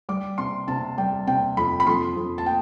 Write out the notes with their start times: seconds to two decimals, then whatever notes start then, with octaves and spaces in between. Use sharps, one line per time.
0.09 G3 D6
0.38 C3 C6
0.68 C3 A5
0.98 G3 G5
1.27 C3 G5
1.57 F2 B5
1.80 B5
1.87 F2 C6
2.16 F2
2.38 A5
2.46 G5